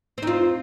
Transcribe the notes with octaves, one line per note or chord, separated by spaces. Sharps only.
C4 D#4 F4